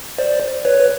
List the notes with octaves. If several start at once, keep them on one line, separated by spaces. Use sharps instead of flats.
C5 D5
B4 C#5
B4